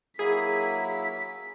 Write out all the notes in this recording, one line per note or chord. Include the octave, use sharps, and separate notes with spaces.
F#3 A#3 E4 G#4 B6